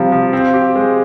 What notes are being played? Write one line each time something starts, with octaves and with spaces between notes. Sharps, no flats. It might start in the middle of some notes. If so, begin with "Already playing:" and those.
Already playing: C3 F3 G3 F5
F3
C4
G4
G#3